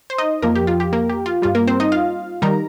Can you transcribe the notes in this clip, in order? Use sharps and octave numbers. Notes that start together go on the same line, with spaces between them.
C5
D#4 D#5
F2 F3 A#3 A#4
G4
F4
G4
A#3 A#4
G4
F4
G2 G3 F4
A#3 A#4
C4 C5
D#4 D#5
F4 F5
D#3 G3 A#4 A#5